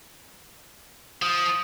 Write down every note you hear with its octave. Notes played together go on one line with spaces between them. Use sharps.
F3 D#6